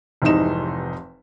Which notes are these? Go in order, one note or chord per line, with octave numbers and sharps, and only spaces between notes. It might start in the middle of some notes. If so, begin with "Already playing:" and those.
F1 G#2 C3 E3 D#4 E7